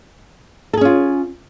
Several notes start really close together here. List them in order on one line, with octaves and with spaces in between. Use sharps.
A4 G#4 C#4 F4